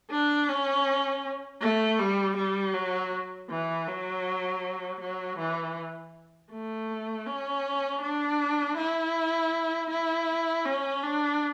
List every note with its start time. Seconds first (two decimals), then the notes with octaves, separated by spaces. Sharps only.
0.11 D4
0.49 C#4
1.62 A3
2.00 G3
2.37 G3
2.75 F#3
3.50 E3
3.88 F#3
5.01 F#3
5.39 E3
6.52 A3
7.27 C#4
8.02 D4
8.77 E4
9.90 E4
10.66 C#4
11.04 D4